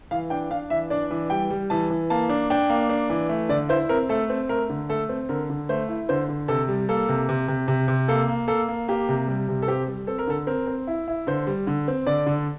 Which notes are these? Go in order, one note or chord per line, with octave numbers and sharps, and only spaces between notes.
E3 F5
D4 G5
D4 F5
E3 E5
D4 D5
E3
G3 G5
G3
E3 A5
E3
A#3 A5
D4
D4 G5
A#3
D4
E3
A3
D3 D5
E4 C5
C4 A#4
A3 A4
C4
A3 A#4
D3
A3 A4
C4
D3 A#4
D3
A3 C5
E4
D3 C5
D3
C3 A4
G3
A#3 A4
C3
C3
C3
C3
C3
A#3 A4
A#3
A#3 A4
A#3
A#3 G4
C3
G3
C3
A4
C4 G4
G3
C4 A4
A#4
D3 A4
C4 A#4
C4
E4
E4
D3 C5
G3
D3
C4
D3 D5
D3